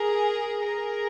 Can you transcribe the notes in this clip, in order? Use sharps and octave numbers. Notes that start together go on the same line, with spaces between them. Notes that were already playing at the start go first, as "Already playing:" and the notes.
Already playing: G#4 A#4
G#4 A#4